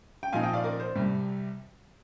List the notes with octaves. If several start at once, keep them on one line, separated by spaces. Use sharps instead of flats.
G5
A#2 F3 C4 D#4 F5 G#5
D#5 G5
D5 F5
A#4 D5
C5
C2 C3 G3